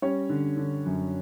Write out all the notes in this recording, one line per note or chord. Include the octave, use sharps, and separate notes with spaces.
G3 C#4 C#5
D3
D3
F#2